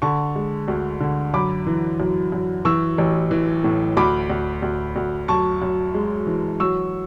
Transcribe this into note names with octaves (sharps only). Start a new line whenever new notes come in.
D3 A5 C#6
G#3
D2
D3
F#2 B5 D6
E3
F#2
F#2
E3 C#6 E6
A1
E3
A2
D2 B5 D6
D2
D2
D2
F#2 A5 C#6
F#2
G#3
E3
F#3 C#6 E6